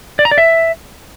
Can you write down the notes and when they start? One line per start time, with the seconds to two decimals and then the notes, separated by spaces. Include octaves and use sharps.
0.19 D5
0.25 A#5
0.31 D5
0.38 E5